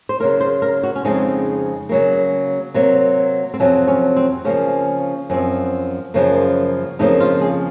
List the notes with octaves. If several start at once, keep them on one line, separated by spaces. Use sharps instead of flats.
C5
C#3 F#3 A#3 A#4
C5
A#4
F#4
C#4
F2 C#3 G#3 C4 D#4
C#3 F#3 A#3
C3 F#3 A#3
C4
F2 C3 F#3 C#4
C#4
C4
C#3 F3 A#3 C#4
F#2 F3 C4
F#2 C#3 F3 A#3
F2 C#3 F3 A#3 D#4
F4
G#4